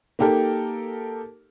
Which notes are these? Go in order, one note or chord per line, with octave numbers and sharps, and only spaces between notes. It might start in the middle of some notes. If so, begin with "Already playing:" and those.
A#3 D#4 G4 A4 A#4